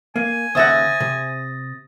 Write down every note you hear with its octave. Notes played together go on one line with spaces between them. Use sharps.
A#3 G#5
D#2 C#3 C5 E5 F#5 D#6 A6 A#6
C3